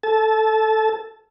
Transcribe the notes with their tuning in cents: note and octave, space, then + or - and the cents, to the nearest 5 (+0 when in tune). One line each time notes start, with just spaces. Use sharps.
A4 +0 A5 -25